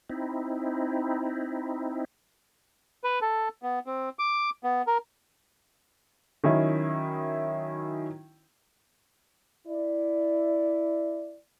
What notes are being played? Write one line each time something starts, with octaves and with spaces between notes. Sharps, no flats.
C4 D#4 E4
B4
A4
B3
C4
D6
B3
A#4
D#3 F#3 C#4 D#4 E4
E4 D5